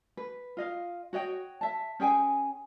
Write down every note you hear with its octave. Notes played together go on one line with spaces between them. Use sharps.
B4
F4 D#5 F5
F#4 C#5 D#5 G5
E5 A5
C#4 G#4 G5 G#5